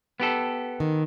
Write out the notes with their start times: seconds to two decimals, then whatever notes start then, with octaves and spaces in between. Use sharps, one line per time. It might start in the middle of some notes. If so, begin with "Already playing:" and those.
0.20 B3 G4 A4
0.80 D#3